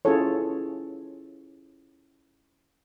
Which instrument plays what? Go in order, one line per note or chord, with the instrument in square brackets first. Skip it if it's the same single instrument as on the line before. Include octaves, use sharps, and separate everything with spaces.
[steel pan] C#4 E4 F4 G#4 A4 C#5